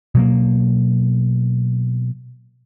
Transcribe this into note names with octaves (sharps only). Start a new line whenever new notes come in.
B2 F#3 A#3